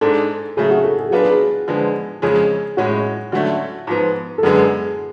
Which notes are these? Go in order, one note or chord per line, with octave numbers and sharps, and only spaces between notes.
G#2 G#3 D4 A4
C#3 F#3 A3 G#4
F#4
A4
G#4
F#3 B3 D4 F4 F#4 B4
G#4
D3 F3 G#3 B3
F2 C#3 G#3 C#4 G#4
A2 G#3 C#4 F#4
D3 F#3 A3 C#4 F#4
G#2 F3 B3
A4
F#2 D3 G#3 B3 G#4